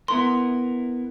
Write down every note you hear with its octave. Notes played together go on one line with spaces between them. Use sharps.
B3 E4 A#4 C6